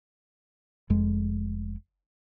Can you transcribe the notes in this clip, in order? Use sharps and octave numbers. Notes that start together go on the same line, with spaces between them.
F1 F2 G#3